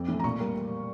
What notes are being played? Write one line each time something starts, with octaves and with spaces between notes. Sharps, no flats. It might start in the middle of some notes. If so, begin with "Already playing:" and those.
Already playing: F2 D6
E3 A3
A#5
A#2 C#6
G3 A#3